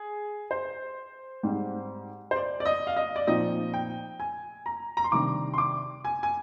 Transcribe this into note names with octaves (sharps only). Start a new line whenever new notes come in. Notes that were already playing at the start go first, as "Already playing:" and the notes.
Already playing: G#4
C5
G#2 G3 C4
C5
D5
D5
D#5
F5
D#5
D5
A#2 F3 C4 D#4 D#5
G5
G#5
A#5
A#5
C6
C3 D#3 G3 D4 D6
C6
D6
G#5
G#5